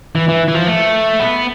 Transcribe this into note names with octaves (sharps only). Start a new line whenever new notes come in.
E3
E3
E3
F3
A3
B3